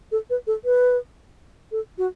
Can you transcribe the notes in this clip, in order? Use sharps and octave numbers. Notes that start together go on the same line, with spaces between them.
A4
B4
A4
B4
A4
F#4